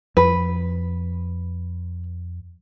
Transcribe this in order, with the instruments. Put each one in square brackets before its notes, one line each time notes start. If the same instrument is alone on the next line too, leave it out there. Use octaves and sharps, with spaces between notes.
[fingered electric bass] F2 [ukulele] B4